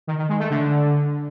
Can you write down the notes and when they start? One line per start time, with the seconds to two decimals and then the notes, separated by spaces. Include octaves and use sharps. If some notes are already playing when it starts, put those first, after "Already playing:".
0.07 D#3
0.18 D#3
0.29 G#3
0.40 A3
0.50 D3